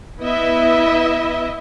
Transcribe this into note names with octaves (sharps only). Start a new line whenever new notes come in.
B3 E4 D#5 E5